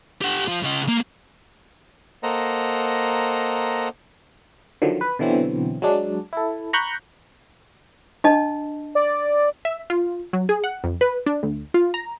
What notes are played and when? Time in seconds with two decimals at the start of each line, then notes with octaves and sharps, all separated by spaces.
0.21 G4 F#5
0.48 F3
0.63 C#3 D#5
0.88 A#3
2.23 A#3 A4 C5 D#5 F#5 A#5
4.82 D3 D#3 F3 F#3
5.01 B4
5.19 B2 D3 E3 F#3 C4
5.82 F#3 G#3 D4
6.33 E4 A4
6.73 A#5 B5 C#6 F#6 G6
8.24 D4 D#5 A5
8.95 D5
9.65 E5
9.90 F4
10.33 F#3
10.49 G#4
10.64 F#5
10.84 F2
11.01 B4
11.26 D4
11.43 D2
11.74 F4
11.94 A#5